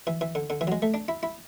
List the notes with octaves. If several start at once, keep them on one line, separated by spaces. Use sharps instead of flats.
E3
E3
D3
D3
E3
F#3
G#3
A3
D4
E4
E4